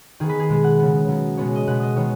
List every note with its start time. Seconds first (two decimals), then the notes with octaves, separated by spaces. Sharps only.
0.20 D#3 B3 G#4
0.29 B4
0.40 G#4
0.49 B2 G#3 B3
0.64 F#5
0.79 C#3 B3
1.08 C#3 F#3 B3
1.37 B2 G#3 B3 C#5
1.56 D#5
1.67 B2 G#3 B3 F#5
1.82 D#5
1.96 D#3 G#3 B3 C#5